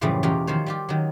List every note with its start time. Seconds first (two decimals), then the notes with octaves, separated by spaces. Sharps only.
0.01 F#2 A2 C#3 E3 F3 G3
0.23 E2 B2 C#4 F4 G4 A#4
0.47 D#3 F3 F4 C5 C#5
0.66 G3 F4 G4
0.89 D#3 F#3